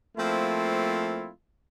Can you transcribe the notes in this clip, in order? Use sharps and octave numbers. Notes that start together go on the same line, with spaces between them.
F3 A3 A#3 C4 E4 F4